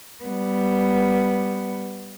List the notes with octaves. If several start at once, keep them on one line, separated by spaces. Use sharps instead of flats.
G3 B3